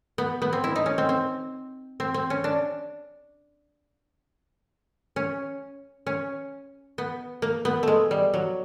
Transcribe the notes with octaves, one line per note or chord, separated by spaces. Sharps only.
B3
B3
C4
E4
D#4
C#4
C4
C4
C4
C4
C#4
D4
C#4
C#4
B3
A#3
B3
G#3 A3
G3
F#3